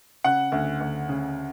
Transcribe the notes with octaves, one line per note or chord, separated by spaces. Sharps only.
C#3 F#5
D2
D2
C#3